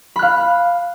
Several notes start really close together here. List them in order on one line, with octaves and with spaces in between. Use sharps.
B5 F#6 F5